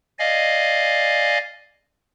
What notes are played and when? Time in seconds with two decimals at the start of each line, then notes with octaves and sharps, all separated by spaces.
0.19 D5 D#5 F5 G#5